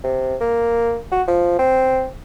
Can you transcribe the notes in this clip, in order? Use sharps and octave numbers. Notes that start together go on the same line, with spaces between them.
C3
A#3
F#4
F3
C4